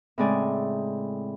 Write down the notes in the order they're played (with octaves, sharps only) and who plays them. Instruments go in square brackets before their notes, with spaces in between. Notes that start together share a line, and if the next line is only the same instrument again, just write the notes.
[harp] A2 C#3 G#3 C4 D5 G#5